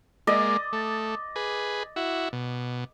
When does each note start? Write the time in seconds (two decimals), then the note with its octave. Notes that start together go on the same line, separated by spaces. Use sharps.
0.27 G#3 A#3 D5 D#5
0.73 A3
1.36 G#4 B4
1.96 E4 F#4
2.33 B2